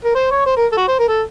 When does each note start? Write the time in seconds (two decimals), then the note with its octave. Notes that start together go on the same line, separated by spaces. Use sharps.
0.04 A#4
0.15 C5
0.31 C#5
0.46 C5
0.57 A#4
0.72 A4
0.77 F#4
0.88 C5
0.99 A#4
1.08 A4